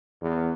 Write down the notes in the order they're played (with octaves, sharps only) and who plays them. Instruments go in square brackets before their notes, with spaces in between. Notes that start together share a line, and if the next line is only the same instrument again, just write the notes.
[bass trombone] E2